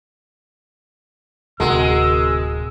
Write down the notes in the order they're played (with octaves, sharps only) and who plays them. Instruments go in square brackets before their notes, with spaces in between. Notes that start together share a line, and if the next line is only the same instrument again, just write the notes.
[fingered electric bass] D1 [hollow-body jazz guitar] C3 F#4 A#4 [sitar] G#3 [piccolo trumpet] E6